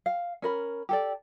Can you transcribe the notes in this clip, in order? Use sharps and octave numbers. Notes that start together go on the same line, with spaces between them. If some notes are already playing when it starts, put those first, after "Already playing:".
F5
C#4 A#4 B5
G4 A4 D5